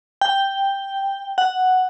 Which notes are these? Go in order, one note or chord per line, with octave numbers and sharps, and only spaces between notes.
G5
F#5